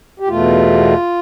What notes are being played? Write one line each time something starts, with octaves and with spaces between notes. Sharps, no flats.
G4
E2 B2 A3 F4